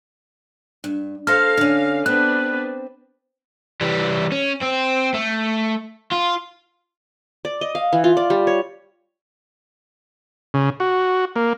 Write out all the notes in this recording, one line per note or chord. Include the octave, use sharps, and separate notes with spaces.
G2
A4 C5 F5 F6 A#6
D3 C#4
B3 C4 D4 B4 F#6
E3 G3
C#4
C4
A3
F4
D5
D#5
F5
E3
F4
D5
G3
C#5
C#3
F#4
A#3